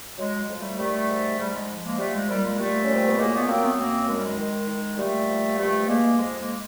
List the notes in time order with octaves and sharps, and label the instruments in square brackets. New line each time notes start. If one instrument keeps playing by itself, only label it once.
[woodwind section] F#3 G#3
F2
G3 A3
D#3 G3 A3
G#2
G#2 G3
G#3
F3
G#3 A#3
F3 G3 A3
G#3
A#2 G3
G#3
A#2 G3 A3
C#4
A#2
C4
B3
F#3 G#3 A#3
A3 B3
F#3 A#3 C4
A3 B3
B3
F#2 A#3 C4
D#3 G#3
G3
G#3
D#3
D#3
A#2 G3 A3
F3
G2 G3 A3
G2 G#3 A#3
F2 G#3
G#3 A#3